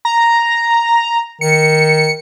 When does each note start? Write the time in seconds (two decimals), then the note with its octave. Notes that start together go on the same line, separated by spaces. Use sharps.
0.05 A#5
1.41 D#3 C#7